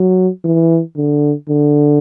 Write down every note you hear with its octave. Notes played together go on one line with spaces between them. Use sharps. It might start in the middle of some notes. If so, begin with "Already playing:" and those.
Already playing: F#3
E3
D3
D3